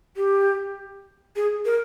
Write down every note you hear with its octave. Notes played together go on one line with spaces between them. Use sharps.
G4
G#4
A#4